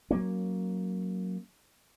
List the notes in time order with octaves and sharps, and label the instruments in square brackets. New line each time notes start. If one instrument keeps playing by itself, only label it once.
[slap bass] F#3 A#3 C#4